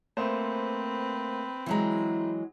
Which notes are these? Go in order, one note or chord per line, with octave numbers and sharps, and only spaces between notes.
A3 A#3 C4 B4 C5
E3 F#3 G#3 E4 A#5